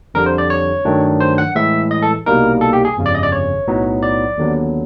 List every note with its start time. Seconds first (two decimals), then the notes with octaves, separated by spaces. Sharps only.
0.14 F2 D3 G3 A#4
0.26 C5
0.38 D5
0.50 C#5
0.85 G2 D#3 F#3 A3 D4
1.20 C5
1.38 F#5
1.55 A2 E3 G#3 E5
1.91 D#5
2.02 A4
2.26 C2 B2 G3 A#3 D#4 A#4
2.61 A4
2.73 G4
2.85 G#4
2.97 G1 F2 C#3
3.06 D5
3.15 D#5
3.23 D5
3.32 C#5
3.67 B1 A2 F#3 B3 D#4
4.03 D5
4.37 D#2 D3 F#3 B3